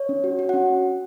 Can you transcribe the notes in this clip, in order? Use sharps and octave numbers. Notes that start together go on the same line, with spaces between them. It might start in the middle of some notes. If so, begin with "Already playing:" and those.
Already playing: C#5
C#4
F#4
F#4
F#5
C#4